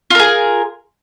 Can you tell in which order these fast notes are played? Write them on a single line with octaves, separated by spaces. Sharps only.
F4 A#4 G#4